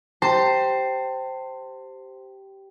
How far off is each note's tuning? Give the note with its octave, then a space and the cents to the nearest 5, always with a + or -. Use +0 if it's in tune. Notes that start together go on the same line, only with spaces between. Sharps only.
G4 -10 C5 +0 A5 +30